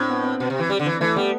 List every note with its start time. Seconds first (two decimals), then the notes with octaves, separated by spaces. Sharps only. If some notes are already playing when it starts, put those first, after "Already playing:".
Already playing: A2 C4 D4
0.10 B3
0.24 C4
0.40 B2
0.50 C3
0.60 E3
0.70 G3
0.79 D3
0.86 E3
1.00 E3 A3
1.16 G3 B3